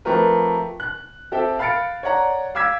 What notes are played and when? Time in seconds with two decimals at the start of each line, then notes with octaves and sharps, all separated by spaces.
0.05 F3 A3 C4 G4 A#4 B4
0.80 F#6
1.32 C4 G4 A4 E5 G5
1.59 F5 B5 F6 A6 C#7 D7
2.03 C#5 D5 F#5 A#5
2.55 F5 D6 E6 G#6 B6